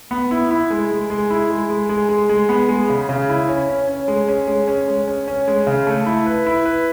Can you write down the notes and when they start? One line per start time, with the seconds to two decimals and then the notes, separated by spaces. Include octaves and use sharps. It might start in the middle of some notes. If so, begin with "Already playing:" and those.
0.11 B3
0.31 E4
0.51 E4
0.70 G#3
0.91 G#3
1.10 G#3
1.30 E4
1.50 G#3
1.70 G#3
1.89 G#3
2.09 G#3
2.30 G#3
2.49 B3
2.69 G#3
2.90 C#3
3.09 C#3
3.29 E4
3.48 C#4
3.68 C#4
3.88 C#4
4.08 G#3
4.28 C#4
4.47 G#3
4.67 C#4
4.88 G#3
5.08 C#4
5.28 C#4
5.48 G#3
5.67 C#3
5.87 A3
6.06 E4
6.26 B4
6.46 E4
6.65 B4